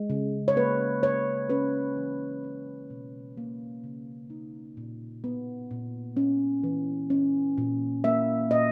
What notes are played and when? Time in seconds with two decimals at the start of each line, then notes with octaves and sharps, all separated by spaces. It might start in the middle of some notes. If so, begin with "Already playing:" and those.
Already playing: G#3
0.10 C#3
0.48 C#5
0.56 A#3 B4
1.03 C#3 C#5
1.50 C#4 B4
1.97 E3
2.44 C#4
2.90 B2
3.37 A#3
3.84 C#3
4.30 D#4
4.77 A#2
5.24 B3
5.71 A#2
6.17 C#4
6.64 E3
7.10 C#4
7.58 A#2
8.04 A#3 E5
8.51 A#2 D#5